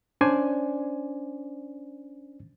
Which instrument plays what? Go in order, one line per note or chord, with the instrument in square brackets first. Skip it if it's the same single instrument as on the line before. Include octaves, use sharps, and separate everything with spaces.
[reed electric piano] C#4 D4 C5 D5 G#5